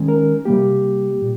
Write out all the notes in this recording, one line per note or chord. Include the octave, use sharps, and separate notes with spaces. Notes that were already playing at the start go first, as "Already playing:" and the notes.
Already playing: D#3 G#3 C#4
A#4
C3 G3 A#3 G4
A#2